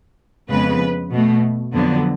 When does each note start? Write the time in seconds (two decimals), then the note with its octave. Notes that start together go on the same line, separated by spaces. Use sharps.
0.50 F2 C#3 G#3 B3 B4
1.12 B2 A3
1.73 F2 D3 F#3 B3